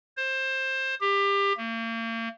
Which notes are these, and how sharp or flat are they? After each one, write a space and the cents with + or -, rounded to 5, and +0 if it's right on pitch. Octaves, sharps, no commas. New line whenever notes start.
C5 +20
G4 +25
A#3 -40